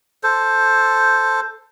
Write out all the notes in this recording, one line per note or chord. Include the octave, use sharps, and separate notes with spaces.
A4 C5